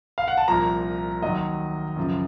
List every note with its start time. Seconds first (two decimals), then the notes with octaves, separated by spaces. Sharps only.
0.18 F5
0.28 F#5
0.37 A5
0.48 C2 A#2 F3 A#5
1.22 D#2 D#3 F#3 D#5
1.96 F#2 C#3 F3